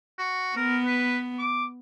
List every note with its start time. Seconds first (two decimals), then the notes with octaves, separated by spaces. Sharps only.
0.18 F#4
0.57 B3 A#4
0.85 B4
1.38 D6